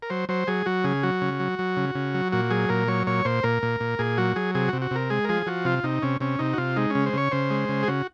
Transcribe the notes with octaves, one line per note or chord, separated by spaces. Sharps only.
A#4
F#3 C5
F#3 C5
F#3 G#4
F#3 F#4
C#3 G#4
F#3 F#4
C#3
F#3
F#3
C#3
C#3
F#3
A#2 F#4
F#3 G#4
A#2 A#4
F#3 C#5
A#2 C#5
A#2 C5
A#2 A#4
A#2
A#2
A#2 G#4
F#3 F#4
F#3 G#4
C3 G#4
F#4
C3
F#4
C3 A#4
G#3 G#4
A#4
F3 G#4
F3 F#4
C3 F4
C3 D#4
C3 C#4
C3 C#4
C3 D#4
F#4
C3 F4
G#3 D#4
C#3 C#4
C5
C#3 C#5
C#3 C5
G#3
C#3
G#4
C#3 F#4